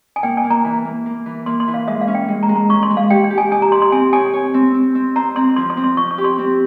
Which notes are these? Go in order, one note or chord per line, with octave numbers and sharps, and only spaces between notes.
G#5
A#3 G5
G#5
A#3
A#5
E3
A#3
A#3
E3
A#3 C6
C6
E3
F5
G#3 E5
F5
C#4
G5
G#3
A#5
G#3
A#5
C#4 C#6
C6
G#3
F5
G4 G5
G5
G4
G#5
G4 G#5
A#5
G4 C6
C6
C4 G#5
C#5 G#5
C#5
C4
C4
C4
C5 A#5
C4 C6
F3 C6
C6
C4
C6
F3 C#6
C#6
G4
C6
C4